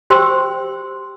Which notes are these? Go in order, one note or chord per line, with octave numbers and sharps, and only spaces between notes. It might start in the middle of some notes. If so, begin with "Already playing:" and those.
G4 C5 G5 C6 E6